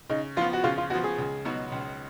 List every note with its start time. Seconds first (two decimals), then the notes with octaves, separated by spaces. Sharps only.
0.09 C#3 D#4
0.37 F3 F4
0.41 B3
0.53 F#4
0.64 C#3 F4
0.78 F4
0.90 F3 B3 F#4
1.04 G#4
1.18 C#2
1.45 B2 F#3 B3 D#4
1.72 C#2